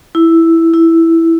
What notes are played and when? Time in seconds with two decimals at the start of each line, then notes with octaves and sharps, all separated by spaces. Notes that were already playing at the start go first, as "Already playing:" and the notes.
0.15 E4
0.74 E4